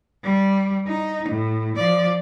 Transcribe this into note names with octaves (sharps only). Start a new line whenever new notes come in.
G3
D#4
A2
F3 D5